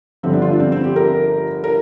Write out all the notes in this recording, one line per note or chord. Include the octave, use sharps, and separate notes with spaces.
G1 G2 D3 F3 C4
D4
F4
D4
C4
C4
G4
A#4
A#4